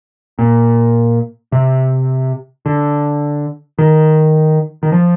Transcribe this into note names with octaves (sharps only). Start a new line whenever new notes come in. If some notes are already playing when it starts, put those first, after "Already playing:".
A#2
C3
D3
D#3
D#3
F3